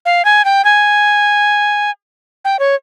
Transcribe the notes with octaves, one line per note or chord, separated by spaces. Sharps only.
F5
G#5
G5
G#5
G5
C#5